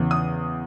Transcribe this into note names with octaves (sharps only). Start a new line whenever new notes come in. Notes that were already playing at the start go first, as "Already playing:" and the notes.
Already playing: E2 C#3 E3
D#6